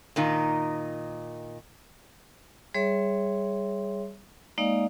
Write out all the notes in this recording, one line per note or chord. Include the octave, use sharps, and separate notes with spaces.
A#2 D#3 D#4
G3 G#4 C#5 E5 C6
G#3 A#3 D#4 D5 D#5 F5